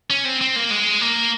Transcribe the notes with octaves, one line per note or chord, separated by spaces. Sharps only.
C#4
C4
C4
A#3
G#3
A#3